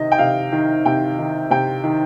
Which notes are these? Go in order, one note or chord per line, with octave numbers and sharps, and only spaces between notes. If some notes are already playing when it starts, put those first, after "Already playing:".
Already playing: C3 D#3 D#5
G5
C3 F5
D#3
C3 G5
D#3
C3 G5
D#3